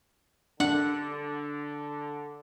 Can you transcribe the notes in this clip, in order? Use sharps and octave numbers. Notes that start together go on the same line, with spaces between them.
D3 D4 F#5